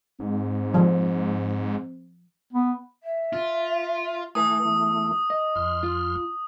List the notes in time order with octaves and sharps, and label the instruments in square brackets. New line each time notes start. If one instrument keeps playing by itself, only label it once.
[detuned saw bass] G#2 [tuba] C4
[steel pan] F3
[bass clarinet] B3
[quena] E5
[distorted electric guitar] F4
[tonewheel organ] A3 E4 [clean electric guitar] B4 G#5 [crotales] D#6
[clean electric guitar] E2
D#5
[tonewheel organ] F2 C6 F6
[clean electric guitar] F4